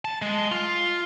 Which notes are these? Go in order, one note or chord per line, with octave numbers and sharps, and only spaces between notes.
A5
G#3
F4